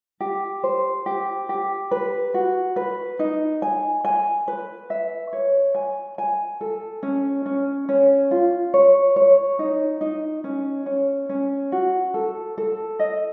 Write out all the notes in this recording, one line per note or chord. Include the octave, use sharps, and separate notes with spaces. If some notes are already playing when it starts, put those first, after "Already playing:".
G4
C5
G4
G4
B4
F#4
B4
D#4
G#5
G#5
B4
E5
C#5
G#5
G#5
A4
C#4
C#4
C#4
F4
C#5
C#5
D#4
D#4
C#4
C#4
C#4
F#4
A4
A4
D#5